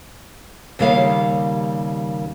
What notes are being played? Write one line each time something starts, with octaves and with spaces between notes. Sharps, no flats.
D#2 C#3 G3 A#3 F5